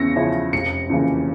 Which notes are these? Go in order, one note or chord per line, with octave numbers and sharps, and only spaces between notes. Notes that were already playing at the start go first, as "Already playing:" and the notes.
Already playing: E2 C#3 F3 C#4 E4 E6 A#6 C#7
C#3 F3 C#4 E4
F1 C#7
F2 C#3 E3 A#3